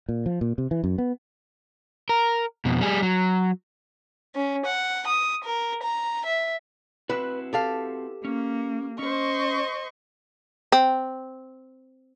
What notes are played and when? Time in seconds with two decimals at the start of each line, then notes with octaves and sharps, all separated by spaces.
0.09 A#2
0.26 F3
0.41 A#2
0.58 C3
0.71 E3
0.84 F#2
0.98 B3
2.09 A#4
2.65 F2 B2
2.81 G3 G#4
3.02 F#3
4.35 C#4
4.66 F#5
5.07 D#6
5.45 A#4
5.83 A#5
6.26 E5
7.09 C4 E4 F#4 B4
7.53 G4 A4 F5
8.25 A#3 C#4
8.99 C#4 C5 D#5 C#6
10.72 C4